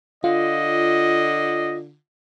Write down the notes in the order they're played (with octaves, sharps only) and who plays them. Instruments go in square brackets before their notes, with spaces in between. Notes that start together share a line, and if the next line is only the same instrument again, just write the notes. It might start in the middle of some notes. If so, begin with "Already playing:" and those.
[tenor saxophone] D3 [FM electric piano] F4 [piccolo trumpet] D#5